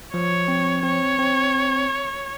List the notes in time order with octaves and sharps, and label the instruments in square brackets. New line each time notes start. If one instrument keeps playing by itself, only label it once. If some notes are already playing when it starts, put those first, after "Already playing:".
[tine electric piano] F3 [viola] C#5
[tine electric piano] C4
[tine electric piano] C4 [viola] C#5
[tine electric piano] C4